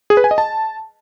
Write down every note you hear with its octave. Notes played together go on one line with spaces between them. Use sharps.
G#4
B4
G#5
D#5
A5